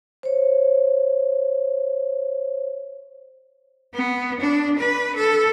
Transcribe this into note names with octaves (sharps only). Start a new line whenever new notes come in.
C5 C#5
B3
D4
B4
A4